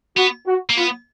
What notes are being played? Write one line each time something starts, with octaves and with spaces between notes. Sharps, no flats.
B3 F#4
F#4
A#3
B3 F4